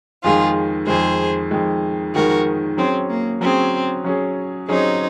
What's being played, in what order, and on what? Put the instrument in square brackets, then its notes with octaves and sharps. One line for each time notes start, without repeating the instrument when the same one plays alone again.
[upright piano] F2 D#3 G#3 [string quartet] F4 G#4
[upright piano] F2 D#3 G#3 [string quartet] G#4 C5
[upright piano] F2 D#3 G#3
[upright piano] F2 D#3 G#3 [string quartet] F#4 A#4
[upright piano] F#3 C#4 G#4 [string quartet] C4
[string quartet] A#3
[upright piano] F#3 C#4 G#4 [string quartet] C4
[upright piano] F#3 C#4 G#4
[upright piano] F#3 C#4 G#4 [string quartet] C4 D#4